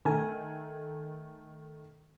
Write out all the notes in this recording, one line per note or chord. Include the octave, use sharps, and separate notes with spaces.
D#3 A3 A#4 G#5